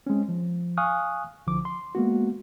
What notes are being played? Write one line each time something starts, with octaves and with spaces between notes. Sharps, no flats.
G#3 C4 C#4
F3
F5 G#5 C#6 D#6 F6 F#6
C2 D3 F3 D6
C6
G#3 A#3 B3 F#4